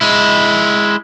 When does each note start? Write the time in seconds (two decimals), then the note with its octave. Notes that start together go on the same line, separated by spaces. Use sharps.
0.01 G#3 E4